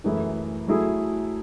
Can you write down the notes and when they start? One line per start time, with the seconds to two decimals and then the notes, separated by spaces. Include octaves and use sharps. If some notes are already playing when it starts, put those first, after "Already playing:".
0.04 F#2 E3 A3 E4 G#4
0.67 F#3 A3 E4 G#4